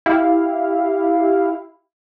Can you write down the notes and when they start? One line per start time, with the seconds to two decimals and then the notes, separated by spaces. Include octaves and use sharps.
0.06 E4 G4 F5